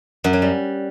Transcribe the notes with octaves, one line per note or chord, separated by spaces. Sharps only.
F#2
F#3
G3